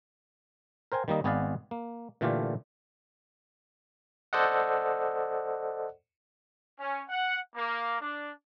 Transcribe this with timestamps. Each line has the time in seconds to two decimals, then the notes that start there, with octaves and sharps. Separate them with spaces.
0.92 A#4 C5 G5 G#5
1.08 D#3 G3 A#3 D#5
1.24 G#1 B3 G#4 B4 D5 F5
1.71 A#3
2.21 A#2 D3 E3 A3 F4 G4
4.33 A4 C5 D5 D#5 F#5
6.79 C#4
7.09 F#5
7.55 A#3
8.00 D4